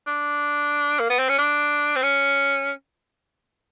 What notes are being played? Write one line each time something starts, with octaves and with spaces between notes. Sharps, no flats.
D4
A#3
B3
C4
C#4
D4
C4
C#4